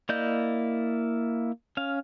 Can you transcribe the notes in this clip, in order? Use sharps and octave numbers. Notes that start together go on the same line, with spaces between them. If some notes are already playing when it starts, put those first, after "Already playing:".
A#3 E4 D5 D#5 G6
C#4 F5